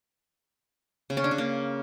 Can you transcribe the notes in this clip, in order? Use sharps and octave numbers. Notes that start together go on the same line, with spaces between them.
C#3
C#4
D4
C#3
A#3